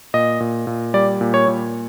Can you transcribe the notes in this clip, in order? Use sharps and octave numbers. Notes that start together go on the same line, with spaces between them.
A#2 D#5
A#2
A#2
G3 D5
A#2
C#5
A#2